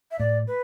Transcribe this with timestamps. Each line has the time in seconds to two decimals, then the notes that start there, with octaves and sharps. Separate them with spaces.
0.11 E5
0.19 A2 D5
0.47 B4